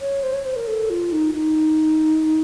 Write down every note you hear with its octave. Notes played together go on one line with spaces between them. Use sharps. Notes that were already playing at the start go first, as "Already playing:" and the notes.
C#5
C5
C#5
C5
A#4
A4
F4
D#4
D#4